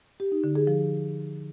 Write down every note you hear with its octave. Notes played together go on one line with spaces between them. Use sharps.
G4
D#4
D3
G#4
F3